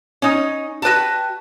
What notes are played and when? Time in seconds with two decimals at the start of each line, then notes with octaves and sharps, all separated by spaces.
0.22 C#4 D#4
0.82 F#4 B4 G5 A5